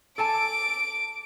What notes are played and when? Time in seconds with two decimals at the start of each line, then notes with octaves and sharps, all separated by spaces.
0.18 A4 G#5 A5 D6 D7